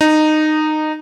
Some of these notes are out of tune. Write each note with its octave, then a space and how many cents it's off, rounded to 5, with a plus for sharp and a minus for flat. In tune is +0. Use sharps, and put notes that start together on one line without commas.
D#4 -15